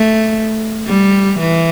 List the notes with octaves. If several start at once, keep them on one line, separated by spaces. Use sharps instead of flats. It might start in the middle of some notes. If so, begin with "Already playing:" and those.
Already playing: A3
G3
E3